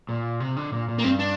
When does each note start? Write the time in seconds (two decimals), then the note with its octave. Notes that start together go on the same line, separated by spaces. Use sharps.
0.09 A#2
0.40 C3
0.57 D3
0.73 A#2
0.88 A#2
0.99 A#3
1.04 G2 C4
1.19 D4